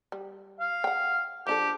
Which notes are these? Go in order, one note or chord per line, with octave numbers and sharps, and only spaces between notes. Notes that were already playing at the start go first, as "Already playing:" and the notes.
G3
F5
F#5 G5
F3 D4 G4 A4